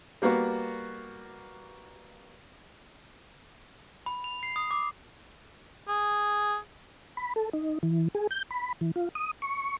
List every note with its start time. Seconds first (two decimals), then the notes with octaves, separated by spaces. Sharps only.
0.22 G3 A#3 B3 F#4
4.06 B5
4.24 F7
4.43 C7
4.56 D#6
4.71 D6
5.89 G#4
7.17 B5
7.36 A4
7.53 D#4
7.83 E3
8.15 G#4
8.31 G6
8.51 B5
8.81 E3
8.96 F4
9.15 D#6
9.42 C#6